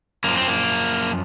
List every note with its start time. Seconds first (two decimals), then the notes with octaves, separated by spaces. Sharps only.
0.24 F#2 F3 A#3
0.36 C4
0.47 A#3